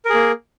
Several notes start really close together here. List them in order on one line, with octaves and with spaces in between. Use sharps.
A#4 G#4 A#3